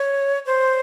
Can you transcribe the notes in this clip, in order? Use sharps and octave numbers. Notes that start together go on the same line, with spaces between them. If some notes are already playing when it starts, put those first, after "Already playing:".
Already playing: C#5
C5